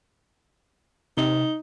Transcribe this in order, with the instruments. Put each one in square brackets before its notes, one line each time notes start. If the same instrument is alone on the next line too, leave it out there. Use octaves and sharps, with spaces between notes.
[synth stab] C3 [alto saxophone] D#4